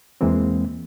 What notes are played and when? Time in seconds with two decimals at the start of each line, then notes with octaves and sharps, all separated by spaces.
0.21 E2 E3 G#3 A#3 C4